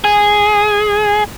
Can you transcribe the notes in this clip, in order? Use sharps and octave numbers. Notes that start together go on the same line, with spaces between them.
G#4